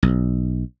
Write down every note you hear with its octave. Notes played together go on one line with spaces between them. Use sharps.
B1